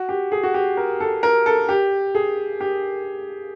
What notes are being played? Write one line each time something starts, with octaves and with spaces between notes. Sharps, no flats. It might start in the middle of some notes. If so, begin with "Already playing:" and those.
Already playing: F#4
G4
G#4
F#4
G4
A#4
A4
A#4
A4
G4
G#4
G4